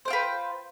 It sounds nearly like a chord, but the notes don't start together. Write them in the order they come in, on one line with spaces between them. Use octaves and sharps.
C5 G5 F4 B4